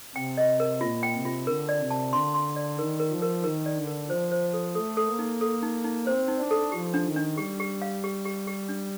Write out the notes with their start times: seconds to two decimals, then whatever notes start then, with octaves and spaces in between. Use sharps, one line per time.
0.15 C3 G5
0.37 D#5
0.60 A#4
0.81 A#2 F4
1.03 G5
1.14 C3
1.25 F4
1.47 D3 A#4
1.69 D5
1.80 C3
1.91 A5
2.13 D3 C6
2.34 C6
2.56 D5
2.79 D#3 A#4
3.00 A#4
3.11 F3
3.22 A#4
3.44 D#3 A#4
3.66 D5
3.77 D3
3.87 A#4
4.09 F3 C5
4.32 C5
4.53 A4
4.75 A3 A4
4.97 A4
5.08 A#3
5.19 D#4
5.41 A4
5.62 D#4
5.84 D#4
6.07 C4 C5
6.28 D#4
6.39 D4
6.51 A4
6.72 F3 G4
6.94 D4
7.05 D#3
7.16 D4
7.37 G3 G4
7.60 G4
7.82 F5
8.04 G4
8.25 G4
8.47 G4
8.69 D4